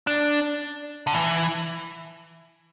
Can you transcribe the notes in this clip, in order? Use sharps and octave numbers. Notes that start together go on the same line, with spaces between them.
D4
D3
E3